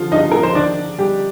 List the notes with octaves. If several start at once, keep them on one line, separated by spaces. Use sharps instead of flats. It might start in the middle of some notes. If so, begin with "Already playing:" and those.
Already playing: D3 F3 F4
G2 D#4 D#5
F3 A#4
C5
D#3 D4 D5
D#3
G3 G4